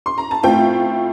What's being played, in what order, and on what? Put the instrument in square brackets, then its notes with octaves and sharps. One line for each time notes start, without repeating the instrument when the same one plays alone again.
[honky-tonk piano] C6
A#5
A5
A2 A3 C4 F4 G5